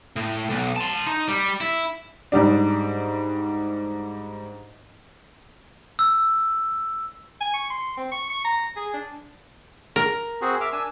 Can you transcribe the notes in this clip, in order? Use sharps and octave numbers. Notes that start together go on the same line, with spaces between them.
A2
B1
A5 C6
D#4
G3
E4
G#2 G3 D4
E6
G#5
C#6
C6
C4
C#6
C#6
A#5
G#4
D4
A#4
C4 F#4 G#4
E5 D6 F6
D4 G#5 E6